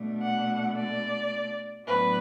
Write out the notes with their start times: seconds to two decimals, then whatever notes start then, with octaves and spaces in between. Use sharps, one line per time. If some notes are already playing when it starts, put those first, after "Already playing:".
Already playing: B2 A3 D4
0.21 F#5
0.76 D5
1.86 A2 F#3 B3 D4 B4